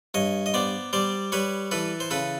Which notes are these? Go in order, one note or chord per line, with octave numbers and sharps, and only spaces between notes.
G2 C#5 D#5
D#5
B3 C5 D5
G3 C5 D5
G3 B4 C#5
E3 A4 B4
C5
C#3 A4 B4